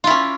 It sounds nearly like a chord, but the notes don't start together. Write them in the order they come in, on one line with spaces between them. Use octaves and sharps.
F4 E4 C#4